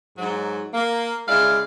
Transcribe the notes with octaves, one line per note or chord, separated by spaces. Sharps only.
G#2 F#3
A#3
C#3 G#3 E4 D5 F5